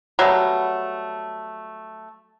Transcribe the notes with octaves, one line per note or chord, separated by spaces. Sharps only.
F#3 G3 A3 B3